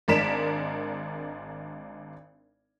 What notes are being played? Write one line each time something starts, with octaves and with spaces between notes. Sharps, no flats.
G#1 G#3 D4 A#4 B6 E7